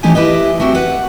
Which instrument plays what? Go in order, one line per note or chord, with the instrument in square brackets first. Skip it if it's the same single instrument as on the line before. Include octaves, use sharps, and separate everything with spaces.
[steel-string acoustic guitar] E3 A3 C#4 D#4 G4 G#5
E4 G4 B4 D#5
A3 C4 F#4 G4
B4 F#5